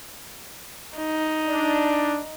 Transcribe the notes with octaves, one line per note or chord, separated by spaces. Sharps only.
D#4
D4